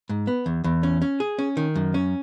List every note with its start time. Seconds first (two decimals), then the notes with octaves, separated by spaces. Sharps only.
0.09 G#2
0.27 B3
0.46 E2
0.64 E2
0.83 C#4
1.02 C#4
1.20 G#4
1.39 C#4
1.57 D#3
1.76 F#2
1.94 C#4